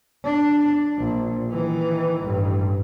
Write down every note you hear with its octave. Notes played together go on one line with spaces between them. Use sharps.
D4
A#1
D#3 E3
A1 G2